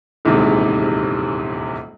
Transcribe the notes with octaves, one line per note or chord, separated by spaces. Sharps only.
D#1 A#1 E2 G#2 C3